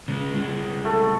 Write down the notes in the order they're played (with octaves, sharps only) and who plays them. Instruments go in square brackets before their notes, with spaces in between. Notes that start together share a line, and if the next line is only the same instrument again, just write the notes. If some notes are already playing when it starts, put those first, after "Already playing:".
[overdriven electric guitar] C#3 G#3
C2 G#3
[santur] A3 A4